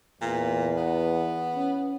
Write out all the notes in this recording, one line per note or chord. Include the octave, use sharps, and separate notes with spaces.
E2 A#2
B3
C#4